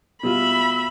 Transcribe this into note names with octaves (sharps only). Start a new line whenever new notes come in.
B2 G3 F4 E5 B5